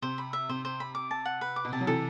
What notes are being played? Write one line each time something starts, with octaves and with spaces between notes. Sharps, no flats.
C3 C5
B5
E5
C3 C5
C5
B5
D6
A5
F#5
B4
D6
B2
C3 A5
F#3
C3 E3 A4